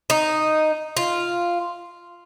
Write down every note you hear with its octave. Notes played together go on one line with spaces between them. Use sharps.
D#4
F4